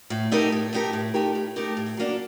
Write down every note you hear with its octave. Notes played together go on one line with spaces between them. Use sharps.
A2
A3 D#4 G4 A#4
A2
A3 D#4 G4 A#4
A2
A3 D#4 G4 A#4
A2
A3 D#4 G4 A#4
A2
F#3 A#3 D4